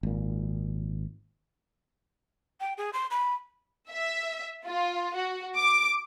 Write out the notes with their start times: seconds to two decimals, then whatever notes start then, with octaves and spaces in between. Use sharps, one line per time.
0.03 G#1 A#2
2.60 G5
2.78 G#4
2.93 C6
3.11 B5
3.90 E5
4.66 F4
5.15 F#4
5.57 D6